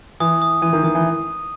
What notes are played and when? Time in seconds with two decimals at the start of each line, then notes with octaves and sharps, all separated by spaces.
0.20 E3 D#6
0.42 D#6
0.62 E3 D#7
0.73 D#3
0.83 D#3 D#6
0.95 E3